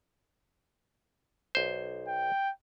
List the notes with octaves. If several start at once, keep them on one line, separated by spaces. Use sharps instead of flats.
B1 C5
G5